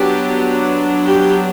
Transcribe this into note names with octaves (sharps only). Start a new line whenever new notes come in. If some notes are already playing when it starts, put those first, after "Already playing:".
Already playing: F#3 B3 D4 G4
G4